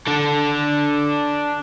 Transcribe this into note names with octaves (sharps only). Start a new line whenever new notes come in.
D4 A4